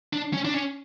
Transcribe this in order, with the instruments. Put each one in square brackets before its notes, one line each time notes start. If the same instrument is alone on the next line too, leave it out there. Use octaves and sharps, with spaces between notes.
[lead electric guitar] D4
C#4
D4
C#4